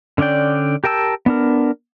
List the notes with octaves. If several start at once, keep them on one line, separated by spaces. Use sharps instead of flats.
D3 C#4 D4 D5 G5
G4 A#4 G5 A5 E6
B3 D4 A#4